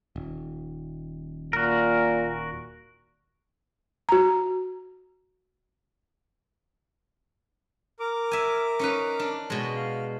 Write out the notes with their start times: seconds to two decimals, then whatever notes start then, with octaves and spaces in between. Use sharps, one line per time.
0.16 D#1
1.53 A#2 F#4 A#4
4.09 F#4 A#5
8.00 A#4 D6
8.31 E5 G#5
8.79 C#4 D#4 B4
9.19 D4
9.50 B2 G#3 C#4
9.75 F5